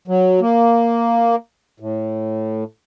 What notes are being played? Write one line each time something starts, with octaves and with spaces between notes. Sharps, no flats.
F#3
A#3
A2